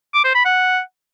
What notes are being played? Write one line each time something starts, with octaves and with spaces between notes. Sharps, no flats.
D6
C5
B5
F#5